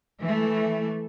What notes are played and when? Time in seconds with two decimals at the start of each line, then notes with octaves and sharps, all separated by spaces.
0.21 E3 A3